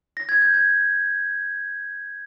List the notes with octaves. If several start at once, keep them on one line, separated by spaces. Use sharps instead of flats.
A#6
G#6
G6
G#6